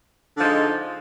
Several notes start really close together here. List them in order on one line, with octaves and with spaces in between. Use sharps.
D3 F3 D#4 G#3